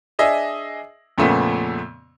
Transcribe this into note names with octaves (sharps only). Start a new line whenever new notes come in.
D4 G#4 D#5 E5
F2 A#2 C#3 A3 B3